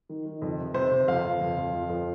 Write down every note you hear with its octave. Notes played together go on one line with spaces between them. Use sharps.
D#3
D#3
F2
C3
C3 C5
C3
F2 F5
F2
F2
F2
F3
F2